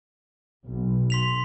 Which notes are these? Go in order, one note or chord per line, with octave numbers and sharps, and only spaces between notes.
B1
C6 B6 F7